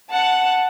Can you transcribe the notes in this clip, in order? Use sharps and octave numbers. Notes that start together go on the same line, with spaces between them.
F#5 A5